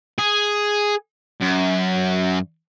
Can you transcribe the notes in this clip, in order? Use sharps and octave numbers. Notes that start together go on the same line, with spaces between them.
G#4
F#2